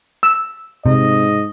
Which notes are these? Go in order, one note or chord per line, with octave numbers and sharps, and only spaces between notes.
E6
G#2 C3 D#5